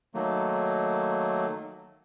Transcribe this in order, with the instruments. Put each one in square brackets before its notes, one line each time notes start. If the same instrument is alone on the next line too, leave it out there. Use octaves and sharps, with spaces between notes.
[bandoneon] D#3 F#3 A3 A#3